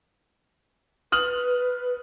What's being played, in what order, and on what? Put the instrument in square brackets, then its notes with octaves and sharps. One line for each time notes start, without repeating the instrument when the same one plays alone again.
[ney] B4 [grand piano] D#6 F6 F#7